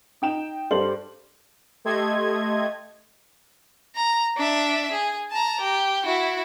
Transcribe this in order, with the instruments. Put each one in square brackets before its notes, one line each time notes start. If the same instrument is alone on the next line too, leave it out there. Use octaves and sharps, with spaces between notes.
[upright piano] D#4 G5 E7
G2 G3 A4 C5 F#7
[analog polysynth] A3 G4 A4 D#5 C6 G#6
[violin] A#5
D4 E5
G#4
A5 A#5
G4
E4 F#4